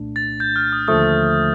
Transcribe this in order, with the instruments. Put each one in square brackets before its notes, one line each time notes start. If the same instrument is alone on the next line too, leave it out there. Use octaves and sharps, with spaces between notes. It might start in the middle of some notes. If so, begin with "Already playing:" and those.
Already playing: [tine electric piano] C2 A#2 A3 D4
[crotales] A6
G6
F6
D#6
[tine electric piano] D#2 D3 F3 A3 [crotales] D#6